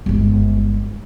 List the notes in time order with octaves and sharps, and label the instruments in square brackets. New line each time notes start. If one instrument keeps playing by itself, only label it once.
[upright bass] G1 G#3